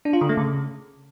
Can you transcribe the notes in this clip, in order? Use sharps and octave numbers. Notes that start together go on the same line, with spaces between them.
D4
F4
D3
A3
C#3